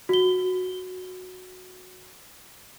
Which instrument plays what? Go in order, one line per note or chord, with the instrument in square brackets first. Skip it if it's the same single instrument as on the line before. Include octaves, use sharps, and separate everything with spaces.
[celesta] F#4 G7